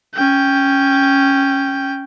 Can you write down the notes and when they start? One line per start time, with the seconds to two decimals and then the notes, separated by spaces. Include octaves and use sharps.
0.14 C#4 G5